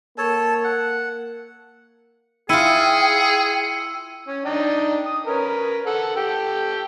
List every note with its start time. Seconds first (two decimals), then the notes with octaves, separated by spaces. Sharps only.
0.18 A#3 A4 C#5 A5
0.64 F#5
2.49 E4 F4 G#4 G5 E6 C#7 D#7
4.28 C#4
4.45 D4 D#4 G5
5.05 D#6
5.26 C#4 A#4 B4
5.86 A4 F#5
6.16 G4 A4 G5